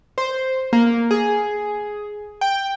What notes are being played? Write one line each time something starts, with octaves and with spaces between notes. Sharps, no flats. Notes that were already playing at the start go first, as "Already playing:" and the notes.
C5
A#3
G#4
G5